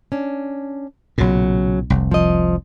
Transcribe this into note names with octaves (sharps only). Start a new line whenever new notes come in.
C#4 D4
B1 A#2 C#3 F#3
F1 C2
F3 D#5